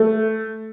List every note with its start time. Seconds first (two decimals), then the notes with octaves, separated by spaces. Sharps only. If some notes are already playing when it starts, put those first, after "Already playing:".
Already playing: A3